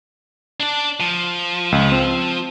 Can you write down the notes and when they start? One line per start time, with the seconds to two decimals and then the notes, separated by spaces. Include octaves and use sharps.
0.60 D4 D5
1.00 F3
1.72 C#2
1.92 C4